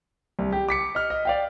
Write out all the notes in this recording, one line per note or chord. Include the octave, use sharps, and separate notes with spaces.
C2
G4
D6 B6 C#7
D#5 F6
D#5
D5 F5 G5